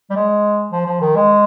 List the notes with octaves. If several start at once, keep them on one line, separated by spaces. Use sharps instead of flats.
G3
G#3
F3
F3
D#3
G#3